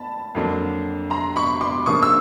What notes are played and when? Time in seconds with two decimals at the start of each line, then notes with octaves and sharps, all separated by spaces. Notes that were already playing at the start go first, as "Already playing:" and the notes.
Already playing: A5 B5
0.35 F2 D3 F#3 A#3 D4
1.10 A#5 C6
1.36 B5 C#6
1.61 C6 D6
1.86 C#3 F3 A#3 D4 C#6 D#6
2.03 E6